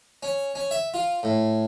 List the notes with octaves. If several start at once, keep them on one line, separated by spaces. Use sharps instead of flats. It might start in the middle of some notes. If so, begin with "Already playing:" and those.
C#4
C#4
E5
F4
A2